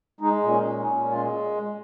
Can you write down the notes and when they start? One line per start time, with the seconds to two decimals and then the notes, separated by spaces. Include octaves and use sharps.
0.20 G#3 D#4
0.43 A#2
0.50 C#4
0.65 C#4
0.80 D#4
0.87 A#2
1.09 G#3 F4